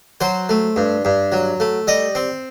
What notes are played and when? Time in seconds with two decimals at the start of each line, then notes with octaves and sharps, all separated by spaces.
0.21 F#3 C5
0.49 A3
0.76 G2
1.05 G2
1.32 F#3
1.60 A3
1.87 G3 D#5
2.15 C4